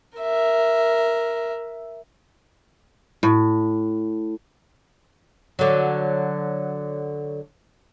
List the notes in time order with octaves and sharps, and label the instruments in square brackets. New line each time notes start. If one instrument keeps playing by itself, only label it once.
[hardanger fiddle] A#4 E5
[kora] A2
[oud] D3 F#3